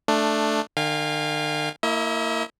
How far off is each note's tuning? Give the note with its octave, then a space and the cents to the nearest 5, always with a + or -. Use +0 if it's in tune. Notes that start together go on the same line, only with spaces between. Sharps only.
A3 +0 D4 +10
D#3 -45 F5 +0 G#5 -40
A#3 -25 E4 +0 D#5 +45